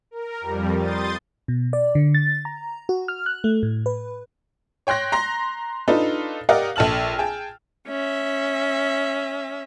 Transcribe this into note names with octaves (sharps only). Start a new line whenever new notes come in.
A#4
F2 G3
C6 D#6 G6 A6
B2
D5
D3
A6
A#5
F#4
F6
F#6
A3
A2
B4
C#5 G5 C6 F#6 A#6
A#5 C6 A#6
D4 D#4 F4 A4 B4
G4 A#4 D5 D#5 F5 F#5
A#1 A4 A5 F6 F#7
G#4 G5 A5
C#4 E5